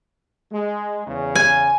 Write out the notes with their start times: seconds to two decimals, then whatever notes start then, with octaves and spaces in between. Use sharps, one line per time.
0.52 G#3
1.07 E2 C#3
1.35 G#5